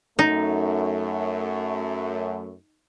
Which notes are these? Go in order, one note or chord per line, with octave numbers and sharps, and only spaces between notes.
F#2 A3 D#4